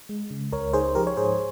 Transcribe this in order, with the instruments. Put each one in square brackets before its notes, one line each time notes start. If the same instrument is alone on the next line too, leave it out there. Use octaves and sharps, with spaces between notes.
[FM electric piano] G#3
C#3
C#2 A#4 C#5
D#4 G#4 C5
F3 G4 A#4
C#5
G#2 G#4 C5